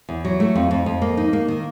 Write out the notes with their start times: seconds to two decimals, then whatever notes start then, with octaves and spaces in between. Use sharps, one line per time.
0.09 E2
0.25 F#3
0.40 A3
0.55 F2
0.71 F2
0.86 F2
1.02 A#3
1.17 D#4
1.33 A#3
1.48 D#3